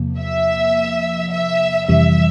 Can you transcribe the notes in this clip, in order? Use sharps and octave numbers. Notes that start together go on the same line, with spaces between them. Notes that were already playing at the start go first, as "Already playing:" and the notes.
Already playing: E2 C3 F3 A#3
E5
E5
F2 C3 E3 G3 E5